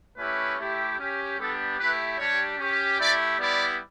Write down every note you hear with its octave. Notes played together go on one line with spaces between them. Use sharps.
A3 C#4 E4 G4 B4
A3 E4 G4
C#4 G4
G3 B3 D4 G4 A4
A3 E4 G4 B4
G3 D4 G4 C#5
C#4 G4
A3 E4 G4 D5
G3 B3 E4 G4 D5